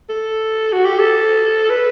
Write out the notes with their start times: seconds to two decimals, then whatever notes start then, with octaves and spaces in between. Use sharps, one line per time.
0.09 A4
0.73 F#4
0.85 G4
0.99 A4
1.70 B4